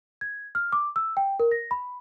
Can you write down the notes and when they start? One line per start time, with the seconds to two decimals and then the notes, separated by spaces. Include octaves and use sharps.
0.21 G#6
0.55 F6
0.73 D6
0.96 E6
1.17 G5
1.40 A#4
1.52 A#6
1.71 B5